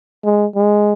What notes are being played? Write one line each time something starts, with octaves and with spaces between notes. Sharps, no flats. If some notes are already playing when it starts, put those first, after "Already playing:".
G#3
G#3